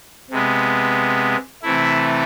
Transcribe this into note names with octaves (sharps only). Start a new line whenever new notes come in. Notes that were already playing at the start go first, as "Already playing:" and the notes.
C3 G#3 B3
C3 E3 A3 E4